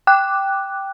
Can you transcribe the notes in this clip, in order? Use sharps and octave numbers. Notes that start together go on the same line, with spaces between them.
G5 D6 F#6